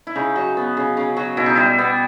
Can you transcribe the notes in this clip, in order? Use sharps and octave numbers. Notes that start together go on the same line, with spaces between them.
E4
C#3 D#4
F#3
B3
C#3
C#3
F#3
B2 E4
D#4
G3 E4
B3